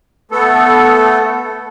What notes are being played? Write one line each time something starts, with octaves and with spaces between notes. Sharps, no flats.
A3 B3 A4